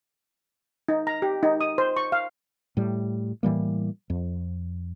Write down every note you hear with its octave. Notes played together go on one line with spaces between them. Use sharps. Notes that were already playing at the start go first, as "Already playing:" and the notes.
D#4
A#5
G4
D#4
D#6
C5
C#6
F5
A2 G3
A2 E3 G3 A#3
F2